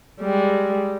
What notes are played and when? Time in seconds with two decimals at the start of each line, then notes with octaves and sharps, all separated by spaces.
0.21 G3 G#3